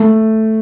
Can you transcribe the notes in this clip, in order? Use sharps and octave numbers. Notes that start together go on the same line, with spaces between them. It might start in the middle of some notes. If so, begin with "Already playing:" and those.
Already playing: A3